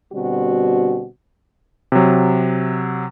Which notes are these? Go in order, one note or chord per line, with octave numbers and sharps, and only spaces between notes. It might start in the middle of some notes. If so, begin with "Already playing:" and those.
B2 D3 G3 C4 F#4
C3 F#3